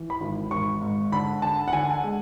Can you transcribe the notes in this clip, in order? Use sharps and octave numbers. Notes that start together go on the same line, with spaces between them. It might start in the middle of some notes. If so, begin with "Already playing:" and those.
Already playing: E3
B5
G#1
G#1 C#6
G#2
D3 B5
D3 A5
F#5
D3 G#5
G#3